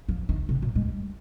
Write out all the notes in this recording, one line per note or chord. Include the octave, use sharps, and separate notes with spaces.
F3
D#3
C3
A#2
G#3
G3